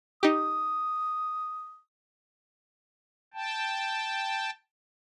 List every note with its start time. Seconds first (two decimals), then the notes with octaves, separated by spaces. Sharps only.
0.23 D#4 G4 D#6
3.34 G5 A5